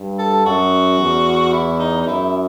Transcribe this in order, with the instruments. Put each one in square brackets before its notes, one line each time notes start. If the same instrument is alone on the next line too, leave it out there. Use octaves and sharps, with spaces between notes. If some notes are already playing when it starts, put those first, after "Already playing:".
Already playing: [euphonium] G2
[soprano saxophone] A4
[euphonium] F#2 [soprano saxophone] F#4
[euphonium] E2
[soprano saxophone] E4
D#4
D#4
[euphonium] F#2 [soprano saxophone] E4